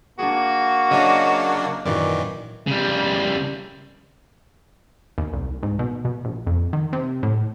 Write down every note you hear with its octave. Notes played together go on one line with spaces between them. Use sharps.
A#3 D4 F#4 G#4
C#3 F#3 D4 D#5
F#2 A#2 D#3 E3 F#4 D5
C#3 G3
D#2
C2
G#2
B2
B2
A#1
F2
D#3
C3
A2